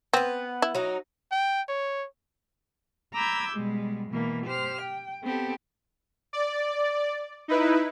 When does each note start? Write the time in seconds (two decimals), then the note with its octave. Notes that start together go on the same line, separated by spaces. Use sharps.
0.13 B3 C4 B4
0.62 E4
0.75 F#3 D#4
1.32 G5
1.69 C#5
3.14 A#5 B5 D6 E6 G6 G#6
3.53 B2 G3 G#3
4.10 B2 E3 A#3
4.46 G4 C5 F6
4.80 G5
5.23 B3 C4 G4 A4
6.33 D5
7.48 D#4 E4 B4